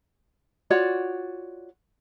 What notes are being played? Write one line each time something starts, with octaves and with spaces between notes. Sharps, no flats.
F4 F#4 C#5 D5